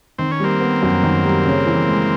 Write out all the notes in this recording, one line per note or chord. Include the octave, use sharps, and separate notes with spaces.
D#3 C4
C#4
G3 A#3 C4
B3
F#2
D#3
G3
C#3
E3
G#3